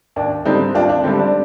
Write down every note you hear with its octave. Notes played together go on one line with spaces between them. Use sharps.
D#2 D4
D3 G3 C4 D#4
D#2 D4 F4
D4
D3 G3 C4
D4